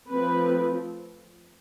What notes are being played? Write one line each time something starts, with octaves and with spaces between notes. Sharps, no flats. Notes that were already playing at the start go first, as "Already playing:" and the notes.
F3 A3 C4 B4